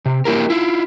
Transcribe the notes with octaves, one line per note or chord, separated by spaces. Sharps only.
C3
A#3 E4 G4 A#4
E4 F4